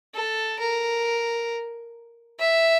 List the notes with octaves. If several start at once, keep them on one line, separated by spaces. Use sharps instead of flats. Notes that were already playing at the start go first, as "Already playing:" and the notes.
A4
A#4
E5